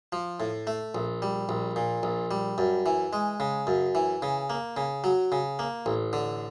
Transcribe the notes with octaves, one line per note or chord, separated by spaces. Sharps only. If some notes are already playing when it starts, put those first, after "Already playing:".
F3
A2
A3
A#1
G3
A#1
A#2
A#1
G3
F#2
E3
G#3
C#3
F#2
E3
C#3
A#3
C#3
F#3
C#3
A#3
A1
D3